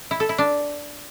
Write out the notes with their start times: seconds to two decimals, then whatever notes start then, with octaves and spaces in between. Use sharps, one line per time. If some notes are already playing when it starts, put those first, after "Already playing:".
0.11 E4
0.20 A4
0.29 E4
0.38 D4